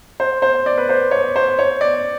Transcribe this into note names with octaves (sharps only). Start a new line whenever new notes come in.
C5
C5
D5
B4
C5
C#5
C5
C#5
D5